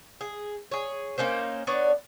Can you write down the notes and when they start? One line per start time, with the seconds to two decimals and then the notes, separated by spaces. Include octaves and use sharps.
0.21 G#4
0.71 G#4 C#5
1.18 A#3 C#4 D#4 C5
1.67 B3 D4 C#5 D5